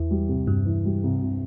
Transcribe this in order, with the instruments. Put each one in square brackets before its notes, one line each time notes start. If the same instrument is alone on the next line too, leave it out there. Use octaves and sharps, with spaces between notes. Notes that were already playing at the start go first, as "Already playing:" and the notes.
Already playing: [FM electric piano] E2 [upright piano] E3
[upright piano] G3
C2
[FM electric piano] G2 [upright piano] C3
[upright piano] E3
G3
C2
C3